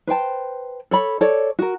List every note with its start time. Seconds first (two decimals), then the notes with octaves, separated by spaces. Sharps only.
0.07 B4 C5 G5 A5
0.91 A4 C#5 B5
1.21 A4 C#5 D5
1.59 F#4 A#4